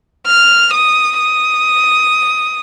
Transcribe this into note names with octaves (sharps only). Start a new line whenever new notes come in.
F6
D#6
D#6